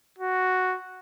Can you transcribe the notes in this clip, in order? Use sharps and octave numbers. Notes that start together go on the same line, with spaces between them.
F#4